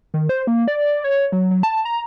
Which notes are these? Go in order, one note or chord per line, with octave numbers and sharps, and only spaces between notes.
D#3
C5
A#3
D5
C#5
F#3
F#3
A5
A#5